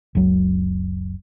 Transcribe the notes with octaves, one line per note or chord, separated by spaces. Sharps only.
F#1 C#2 F#3